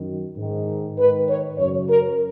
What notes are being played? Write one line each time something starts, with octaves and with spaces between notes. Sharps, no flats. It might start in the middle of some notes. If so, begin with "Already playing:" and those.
Already playing: F#2 D#3
G#2 D#3
G#2 D#3 B4
C#5
F#2 C#3 C#5
A#4